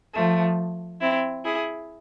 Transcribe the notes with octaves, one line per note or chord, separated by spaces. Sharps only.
F3 A3
C4 E4
E4 G#4